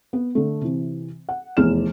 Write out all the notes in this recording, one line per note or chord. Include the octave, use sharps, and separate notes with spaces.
B3
D3 A3
C3 E3
F#5
F1 E2 F6 E7